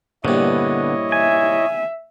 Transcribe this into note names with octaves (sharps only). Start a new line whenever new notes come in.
A#1 G2 D3 B3 E4 C#5 D#5
E5 G#5